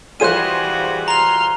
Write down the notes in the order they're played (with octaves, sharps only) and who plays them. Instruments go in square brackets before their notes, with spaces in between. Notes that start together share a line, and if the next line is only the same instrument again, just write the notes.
[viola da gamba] E3 G3 F#4 [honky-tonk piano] F4 G#4 C5 [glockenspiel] F#6 D#7
[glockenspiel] A#5 F7 [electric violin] C6 F6